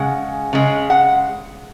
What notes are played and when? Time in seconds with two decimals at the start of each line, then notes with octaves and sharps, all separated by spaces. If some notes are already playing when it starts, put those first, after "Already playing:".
Already playing: C#3 G#3 F#5
0.53 C#3 G#3
0.90 F#5